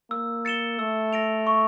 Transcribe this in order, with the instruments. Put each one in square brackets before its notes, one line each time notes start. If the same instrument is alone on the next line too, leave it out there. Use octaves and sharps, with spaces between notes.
[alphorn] A#3 [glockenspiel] E6
[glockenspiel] A6 C#7 E7 G7
[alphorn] A3 [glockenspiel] E6
[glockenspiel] A#6 D7 F7
C#6